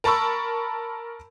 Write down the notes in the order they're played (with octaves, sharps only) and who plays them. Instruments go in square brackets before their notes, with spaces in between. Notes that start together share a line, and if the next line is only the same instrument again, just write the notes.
[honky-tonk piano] A#4 A5 B5 C#6 E6